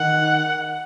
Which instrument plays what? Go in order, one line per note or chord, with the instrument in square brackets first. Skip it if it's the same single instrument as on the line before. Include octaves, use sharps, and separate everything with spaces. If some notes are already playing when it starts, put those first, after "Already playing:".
Already playing: [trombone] D#3 [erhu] F#5